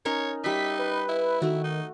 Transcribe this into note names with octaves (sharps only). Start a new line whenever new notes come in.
C#4 D#4 A#4 C#5
G3 D#4 E5 B6
B4
E4
D#3 A3 F#4
D#4